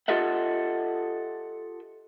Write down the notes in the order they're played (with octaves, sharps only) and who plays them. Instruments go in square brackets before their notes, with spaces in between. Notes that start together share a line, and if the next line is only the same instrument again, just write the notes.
[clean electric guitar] F4 G4 A4 D#5 E5 F#5